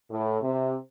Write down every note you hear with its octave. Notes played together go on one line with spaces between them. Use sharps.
A2
C3